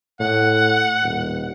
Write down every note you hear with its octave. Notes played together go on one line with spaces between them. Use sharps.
A2 F#5
D#1